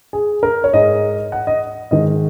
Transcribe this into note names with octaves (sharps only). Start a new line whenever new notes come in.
G#4
A#4
C#5
G#2 G#3 D#5
F#5
D#5
G#2 D#3 G#3 D#5